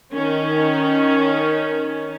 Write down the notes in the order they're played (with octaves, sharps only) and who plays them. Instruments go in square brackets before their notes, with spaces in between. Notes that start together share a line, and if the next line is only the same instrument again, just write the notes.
[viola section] D#3 C#4